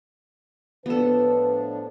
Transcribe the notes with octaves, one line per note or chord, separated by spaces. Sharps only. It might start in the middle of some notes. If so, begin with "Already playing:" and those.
A2 F3 B3 D4 A4 B4